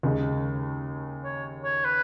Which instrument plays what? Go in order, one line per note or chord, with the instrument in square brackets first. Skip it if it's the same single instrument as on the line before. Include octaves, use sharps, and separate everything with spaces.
[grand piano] D#2 C#3 G#3
[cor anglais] C#5
C#5
B4